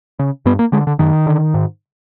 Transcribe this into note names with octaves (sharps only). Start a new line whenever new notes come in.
C#3
G2 B3
A#3
D3 G#3
D3
F#2 D#3
D3
G#2